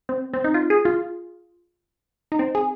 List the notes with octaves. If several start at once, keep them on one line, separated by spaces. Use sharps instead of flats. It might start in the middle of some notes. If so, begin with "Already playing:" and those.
C4
C4
D#4
F4
G#4
F4
D#4
C4
G#4